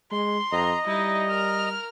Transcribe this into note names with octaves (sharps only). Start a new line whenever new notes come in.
G#3 C6
F2 D#5 A#5
G3 D#4 E4
A#4 F6